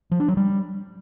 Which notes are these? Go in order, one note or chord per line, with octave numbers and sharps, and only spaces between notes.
F3
D4
F#3
G3